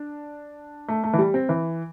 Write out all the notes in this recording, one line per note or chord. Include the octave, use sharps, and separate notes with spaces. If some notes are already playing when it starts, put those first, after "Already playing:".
Already playing: D4
A3
A3
E3
G3
C4
E3